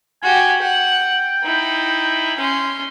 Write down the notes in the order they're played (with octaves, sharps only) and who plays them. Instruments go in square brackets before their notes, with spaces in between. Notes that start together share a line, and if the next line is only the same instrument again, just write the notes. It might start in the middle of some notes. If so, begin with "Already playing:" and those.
[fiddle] F#4 G4 [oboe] G#5
[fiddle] F#5 [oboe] G5
[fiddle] D#4 E4
C#4 C6